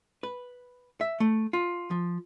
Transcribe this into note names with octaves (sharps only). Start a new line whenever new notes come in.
B4
E5
A3
F4
F3